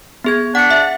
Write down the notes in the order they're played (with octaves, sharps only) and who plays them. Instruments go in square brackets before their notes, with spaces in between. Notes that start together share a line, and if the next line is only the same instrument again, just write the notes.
[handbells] B3 G#4 G#6
[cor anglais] D4 [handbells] F#5 C#7
[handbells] E5